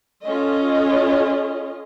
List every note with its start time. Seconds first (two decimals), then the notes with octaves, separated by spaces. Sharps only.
0.23 C#4 F4 A4 D#5